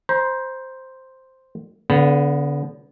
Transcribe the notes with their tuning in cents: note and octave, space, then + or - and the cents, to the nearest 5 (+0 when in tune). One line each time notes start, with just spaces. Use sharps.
C5 +0 A#5 +40
D3 -35 B3 +0